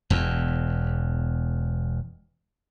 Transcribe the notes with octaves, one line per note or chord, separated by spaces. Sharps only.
E1 E2